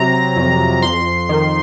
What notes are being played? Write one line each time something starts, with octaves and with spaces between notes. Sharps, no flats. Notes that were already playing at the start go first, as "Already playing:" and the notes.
Already playing: C3 F#3 A#5
F2
F2 C6
D#3